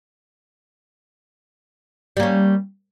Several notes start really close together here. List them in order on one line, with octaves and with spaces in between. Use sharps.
G3 A#3 C#4